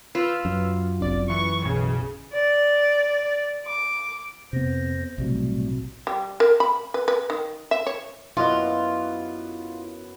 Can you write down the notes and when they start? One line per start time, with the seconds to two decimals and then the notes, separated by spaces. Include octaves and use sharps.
0.15 F4 B4 E6 F6
0.45 F#2
1.00 G1 C2 D5
1.30 E3 C#6
1.63 B1 C#3
2.33 D5
3.66 D6
4.53 F2 C3 B3 C5 A#6
5.18 B1 A2 C3 F#3 G3 A3
6.07 G3
6.40 A#4
6.60 B5
6.94 B4
7.08 B4
7.30 D#3
7.71 E5
7.86 C#5
8.37 F#2 B3 E4 F4 D#5